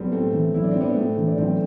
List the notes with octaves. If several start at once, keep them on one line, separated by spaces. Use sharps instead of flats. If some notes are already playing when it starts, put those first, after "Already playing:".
Already playing: B1 G3 B3 C4
A2 A3 C4
E3
B1 E4
D4
C4
B1
B3 D4
A2 A3 C4
E3
D4
B1 A3 C4